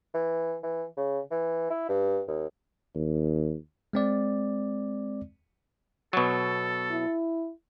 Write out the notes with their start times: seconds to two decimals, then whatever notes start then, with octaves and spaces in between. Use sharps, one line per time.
0.14 E3
0.63 E3
0.97 C#3
1.31 E3
1.70 E4
1.89 G2
2.28 D#2
2.95 D#2
3.93 G#3 C4 D5
6.13 B2 F#3 A4
6.91 E4